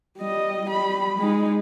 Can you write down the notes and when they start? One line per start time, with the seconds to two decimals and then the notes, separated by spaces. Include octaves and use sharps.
0.19 G3 D#5
0.66 G3 B5
1.19 G#3 D#4